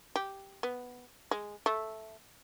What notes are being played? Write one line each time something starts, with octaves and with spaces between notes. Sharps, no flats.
G4
B3
G#3
A3